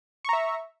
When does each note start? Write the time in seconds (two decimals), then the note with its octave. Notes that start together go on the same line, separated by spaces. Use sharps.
0.25 C#6
0.29 A#5
0.33 E5